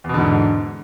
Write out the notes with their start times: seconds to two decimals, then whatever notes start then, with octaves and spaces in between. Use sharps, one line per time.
0.04 E2
0.09 B2
0.14 D3
0.19 G#2